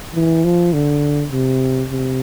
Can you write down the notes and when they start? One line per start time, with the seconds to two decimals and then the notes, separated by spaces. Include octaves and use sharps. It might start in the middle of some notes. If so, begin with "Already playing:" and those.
0.15 E3
0.44 F3
0.73 D3
1.32 C3
1.91 C3